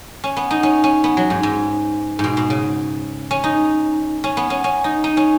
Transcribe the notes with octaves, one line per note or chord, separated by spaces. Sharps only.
C#4
B3
D#4
C#4
C#4
B3
F#3
G#2
G#2
G#2 B2
B2
C#3
C#4
D#4
C#4
B3
C#4
C#4
D#4
D#4
C#4